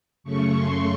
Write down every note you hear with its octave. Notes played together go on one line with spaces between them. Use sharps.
F#2 C#3 A3 C#6
C6